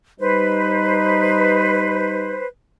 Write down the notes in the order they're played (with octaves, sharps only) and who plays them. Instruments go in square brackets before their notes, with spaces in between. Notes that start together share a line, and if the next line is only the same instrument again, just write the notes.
[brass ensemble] G3 D#4 [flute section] B4 C5